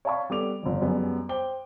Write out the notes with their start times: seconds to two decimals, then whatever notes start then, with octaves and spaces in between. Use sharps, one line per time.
0.05 C#5 D5 F5 A5 B5 C#6
0.30 G3 B3 A4 D6 F7
0.63 G1 F2
0.81 F#2 G3 G#3 B3
1.29 C5 G5 D6 G7